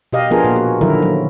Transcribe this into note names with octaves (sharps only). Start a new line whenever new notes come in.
B2 G4 D#5 F5
F3 B3 D4 F4 G#4 A#4
A#2
F#4
D3 D#3 F3 F#3 E4 A#4
F#3